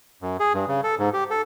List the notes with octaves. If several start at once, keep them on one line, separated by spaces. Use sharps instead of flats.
F#2
G#4
G2
C#3
A4
G#2
G4
A4